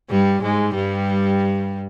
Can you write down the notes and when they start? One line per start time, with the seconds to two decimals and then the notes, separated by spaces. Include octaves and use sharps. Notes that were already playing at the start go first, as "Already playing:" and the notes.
0.10 G2 G3
0.42 G#2 G#3
0.75 G2 G3